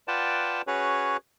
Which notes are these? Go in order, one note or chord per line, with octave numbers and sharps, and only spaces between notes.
F4 B4 D5 F#5 G5 A5
C#4 F#4 G#4 B4 C#5